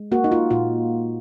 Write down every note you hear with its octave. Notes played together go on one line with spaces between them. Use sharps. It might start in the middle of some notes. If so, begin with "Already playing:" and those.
Already playing: G#3
A#3 F#4
D#4
F4
A#2 F4